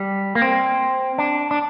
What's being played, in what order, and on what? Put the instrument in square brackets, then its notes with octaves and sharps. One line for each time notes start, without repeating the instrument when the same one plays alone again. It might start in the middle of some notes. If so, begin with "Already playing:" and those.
Already playing: [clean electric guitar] G3
A#3
C4
D4
D4